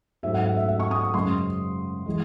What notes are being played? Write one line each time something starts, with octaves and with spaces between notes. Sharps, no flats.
G#2 F#3 A3 E5
F#5
F#5
E5
E5
C#6
D#6
C#6
F#2 C#3 G#3 C6
E3 G#3